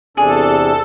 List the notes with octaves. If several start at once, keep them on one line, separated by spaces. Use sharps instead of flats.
E2 C3 D4 G#4 A4